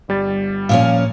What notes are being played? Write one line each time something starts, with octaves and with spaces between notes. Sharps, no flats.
G1 G3 A6
A#2 F3 C#4 F5